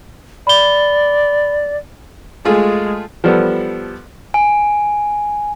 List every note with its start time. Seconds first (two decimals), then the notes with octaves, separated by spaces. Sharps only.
0.47 D5 B5 G7
2.45 G#3 A3 F4 G#4
3.24 F3 G3 B3 A4
4.34 G#5